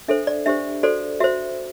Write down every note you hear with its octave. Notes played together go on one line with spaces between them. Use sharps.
D4 A4 C5 E5
D5
D4 G4 C5 E5
F#4 A4 C5 D5
F#4 C5 E5